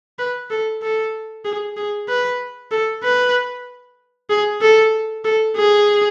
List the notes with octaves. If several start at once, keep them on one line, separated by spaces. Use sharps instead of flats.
B4
A4
A4
G#4
G#4
B4
A4
B4
G#4
A4
A4
G#4